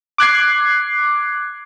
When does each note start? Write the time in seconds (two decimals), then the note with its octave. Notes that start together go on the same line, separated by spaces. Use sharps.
0.18 D6 F#6 G#6 C7